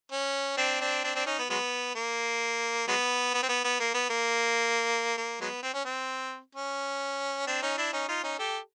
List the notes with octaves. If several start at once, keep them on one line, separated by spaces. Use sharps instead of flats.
C#4
C4 D4
C4 D4
C4 D4
C4 D4
C#4 D#4
B3
F#3 G#3 B3
A#3
F#3 G#3 B3
B3
C4
B3
B3
A#3
B3
A#3
A#3
F#3 G#3 B3
C4
C#4
C4
C#4
C4 D4
C#4 D#4
D4 E4
C#4 D#4
D#4 F4
C#4 D#4
G4 A4